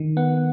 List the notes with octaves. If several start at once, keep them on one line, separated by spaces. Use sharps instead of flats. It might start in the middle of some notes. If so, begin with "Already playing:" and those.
Already playing: D#3
B3 F#5